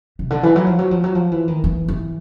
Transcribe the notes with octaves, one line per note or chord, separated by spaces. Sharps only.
C3
D3
E3
F#3
F3
F#3
F3
F#3
F3
E3
D#3
E3
E3